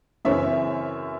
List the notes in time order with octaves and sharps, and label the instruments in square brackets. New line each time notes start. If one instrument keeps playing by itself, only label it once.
[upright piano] F#2 C#3 E3 C4 C#5 E5